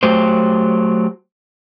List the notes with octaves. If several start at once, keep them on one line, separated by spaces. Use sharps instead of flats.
F#3 A3 G4 C5